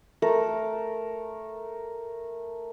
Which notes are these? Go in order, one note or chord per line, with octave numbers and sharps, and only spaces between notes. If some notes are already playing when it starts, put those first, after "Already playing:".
A3 A4 A#4